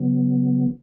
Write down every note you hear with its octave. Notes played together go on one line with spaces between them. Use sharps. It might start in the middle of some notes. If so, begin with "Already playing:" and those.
Already playing: C#3 F#3 B3